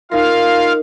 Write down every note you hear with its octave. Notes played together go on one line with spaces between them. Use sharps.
D#4 F4 A#4 F5